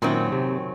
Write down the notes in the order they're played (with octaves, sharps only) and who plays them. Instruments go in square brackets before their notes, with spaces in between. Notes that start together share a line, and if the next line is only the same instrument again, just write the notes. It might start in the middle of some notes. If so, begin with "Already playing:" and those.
[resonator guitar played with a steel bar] F#2 D#3 F#3 C4 [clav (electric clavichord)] A#2
[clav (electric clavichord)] C3